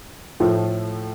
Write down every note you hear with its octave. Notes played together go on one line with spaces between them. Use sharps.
A2 F3 A3